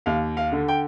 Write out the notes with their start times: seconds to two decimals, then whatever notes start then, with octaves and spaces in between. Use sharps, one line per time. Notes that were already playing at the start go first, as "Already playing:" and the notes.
0.06 D#2 F5
0.37 F5
0.52 D3
0.68 G5